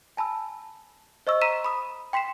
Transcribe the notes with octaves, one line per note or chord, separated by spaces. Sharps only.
G#5 A5 B5 E6
C5 D#5 C#6 E6
A#5 C6 E6 B6 D#7 E7
B5 D#6
G5 C6 B6 C7 E7